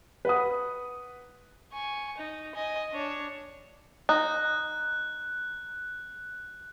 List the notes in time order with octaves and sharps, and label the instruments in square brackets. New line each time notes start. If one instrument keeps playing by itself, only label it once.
[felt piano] B4 F#5 D#6
[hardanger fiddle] G#5 C#6
D#4
D#5 G#5
D4 C#5
[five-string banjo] D#4 [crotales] F#6